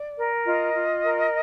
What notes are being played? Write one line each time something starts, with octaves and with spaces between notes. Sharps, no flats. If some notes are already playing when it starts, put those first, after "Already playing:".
Already playing: D5
A#4
F4 D#5
F4
A#4